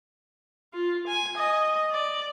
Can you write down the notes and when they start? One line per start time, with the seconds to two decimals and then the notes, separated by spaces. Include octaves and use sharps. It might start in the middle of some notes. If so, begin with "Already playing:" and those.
0.74 F4
1.07 G#5
1.38 D#5
1.92 D5